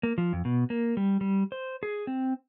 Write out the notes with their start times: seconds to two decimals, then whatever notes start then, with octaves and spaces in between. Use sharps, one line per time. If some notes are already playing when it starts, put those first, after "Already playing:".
0.03 A#3
0.18 F3
0.33 F2
0.45 B2
0.70 A#3
0.97 G3
1.21 G3
1.52 C5
1.83 G#4
2.07 C4